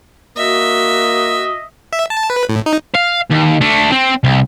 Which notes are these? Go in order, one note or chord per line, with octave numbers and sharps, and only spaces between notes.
A#3 F#4 D#5 E5
E5
A5
B4
A2
D#4
F5
D#2
A3 D4
C4
C2